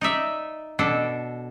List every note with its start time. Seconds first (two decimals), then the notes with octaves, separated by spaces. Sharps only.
0.01 D#4 D5 E5
0.79 B2 D4 A4